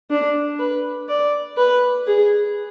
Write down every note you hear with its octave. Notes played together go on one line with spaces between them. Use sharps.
D4
B4
D5
B4
G#4